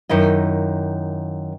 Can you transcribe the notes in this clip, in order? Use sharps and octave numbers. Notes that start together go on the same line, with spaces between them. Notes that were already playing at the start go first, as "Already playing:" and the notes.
F#2 D#3 E4 D#5